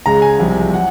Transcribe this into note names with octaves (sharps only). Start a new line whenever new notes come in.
C#2 C#3 G#3 A#5
G#5
C2 C3 F3 G#3
F#3 F#5